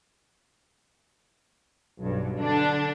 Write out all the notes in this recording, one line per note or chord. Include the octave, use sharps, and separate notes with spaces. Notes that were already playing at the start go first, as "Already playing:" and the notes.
B1 G2
D3 D4